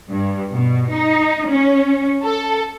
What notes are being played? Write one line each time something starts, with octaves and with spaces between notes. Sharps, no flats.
G2
B2
D#4
C#4
A4